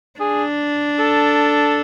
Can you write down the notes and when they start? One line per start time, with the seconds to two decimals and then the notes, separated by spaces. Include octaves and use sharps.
0.20 D4 G#4
0.99 A4